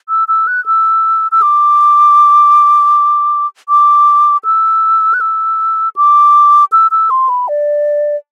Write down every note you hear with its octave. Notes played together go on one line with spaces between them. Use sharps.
E6
E6
F#6
E6
E6
D6
D6
E6
F#6
E6
D6
E6
E6
C6
B5
D5